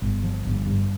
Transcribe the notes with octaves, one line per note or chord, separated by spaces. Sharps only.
G1
F3
G1
G2